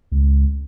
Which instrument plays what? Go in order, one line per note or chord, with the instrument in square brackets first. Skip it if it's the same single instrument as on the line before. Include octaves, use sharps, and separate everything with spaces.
[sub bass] C#2